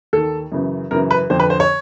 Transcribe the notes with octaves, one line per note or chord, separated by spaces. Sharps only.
D#2 D#3 A4
F#2 C#3 E3
F#2 C#3 E3 A#4
B4
F2 D3 C5
B4
C5
C#5